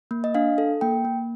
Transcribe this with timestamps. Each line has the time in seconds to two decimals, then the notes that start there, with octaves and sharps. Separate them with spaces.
0.11 A#3
0.24 D#5
0.35 D4 F5
0.58 A4
0.81 A#3 G5
1.05 A#3